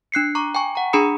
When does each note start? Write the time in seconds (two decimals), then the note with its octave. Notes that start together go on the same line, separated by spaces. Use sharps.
0.12 D4 F#6 C7 C#7
0.35 A#5 C#6 D6
0.55 G5 G#5 C#6
0.75 F#5 A#5
0.93 D4 G#4 A#5 B5 D#6 C#7